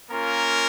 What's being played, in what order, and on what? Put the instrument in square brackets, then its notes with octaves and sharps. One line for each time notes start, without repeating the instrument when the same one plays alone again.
[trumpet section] A#3 C#4 F4 A#4